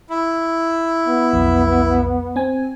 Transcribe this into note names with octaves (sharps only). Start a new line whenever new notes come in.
E4
B3
B1 F2
C4 G#5